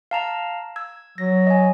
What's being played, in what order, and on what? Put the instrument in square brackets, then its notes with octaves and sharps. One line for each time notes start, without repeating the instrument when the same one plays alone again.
[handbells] F5 A5 A#5
E6 G#6
[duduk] F#3 [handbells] A#6
[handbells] D#5 G#5